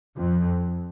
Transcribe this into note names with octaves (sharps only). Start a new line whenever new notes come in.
F2